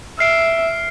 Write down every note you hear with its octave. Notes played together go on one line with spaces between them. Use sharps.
E5 F6 C7 D7